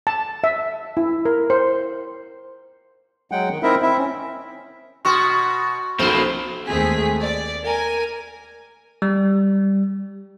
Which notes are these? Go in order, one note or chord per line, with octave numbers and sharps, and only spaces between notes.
A5
E5
E4
A#4
C5
F#3 G#3 F#5 G5
D#3
C4 D#4 E4 A#4 E5
C4 E4 E5
C#4
B2 F#4 C6 C#6 D#6 F6 A6
B1 F2 A#3 E4 F#4 C5 B5
D#2 G#3 A3 C4 G#4 B6
D5
A#4 G#5
G3